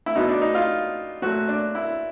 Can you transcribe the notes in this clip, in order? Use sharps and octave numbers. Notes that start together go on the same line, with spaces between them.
E4
B2 F#3 B3 D#4
D4
D#4
F4
A#2 F#3 A3 F#4
D4
E4